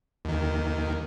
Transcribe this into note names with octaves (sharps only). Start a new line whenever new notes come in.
D#2 D#3